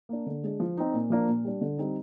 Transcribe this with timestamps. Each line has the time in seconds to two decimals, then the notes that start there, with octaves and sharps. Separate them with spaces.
0.09 A#3 D4
0.26 D3
0.43 G#3 D4
0.60 F3
0.77 C4 D#4
0.93 A#2
1.10 F3 A#3 D4
1.28 A#2
1.45 G3 D4
1.61 D3
1.78 G3 C4 D#4